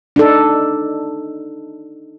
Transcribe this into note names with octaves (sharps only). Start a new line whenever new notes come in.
D4 D#4 A4